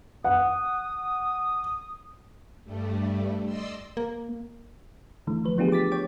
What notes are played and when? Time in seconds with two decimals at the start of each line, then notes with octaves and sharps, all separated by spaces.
0.24 F#5 D#6
2.64 G2 G3 A3
3.45 D5 D#5 C6 E6
3.97 A#3
5.27 D3 E3 A3
5.45 F3 B4
5.58 F3 B3 D4 F4 G4 G#4
5.72 D6 A6 B6
5.92 C#5 G5 D6